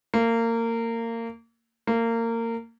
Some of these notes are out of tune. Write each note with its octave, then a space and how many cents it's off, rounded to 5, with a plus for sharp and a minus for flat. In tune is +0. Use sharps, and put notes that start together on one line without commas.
A#3 -25
A#3 -25